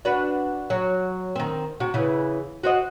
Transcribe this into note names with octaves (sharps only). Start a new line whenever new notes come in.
D4 F#4 B4
F#3
D#3 C4
C3 F#4
C#3 E3
F#4 C5 D#5